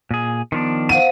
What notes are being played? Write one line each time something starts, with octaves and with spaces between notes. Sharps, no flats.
A#2 G#4
D#3 F3 B3 D4
C5 F5 F#5 D#7